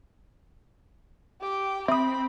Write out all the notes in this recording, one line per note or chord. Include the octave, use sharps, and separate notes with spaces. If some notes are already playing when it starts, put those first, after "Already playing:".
G4 G5
C4 E5 B5 D#6